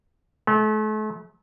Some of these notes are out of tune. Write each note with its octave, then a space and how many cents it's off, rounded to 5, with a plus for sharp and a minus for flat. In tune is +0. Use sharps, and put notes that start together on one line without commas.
A3 -40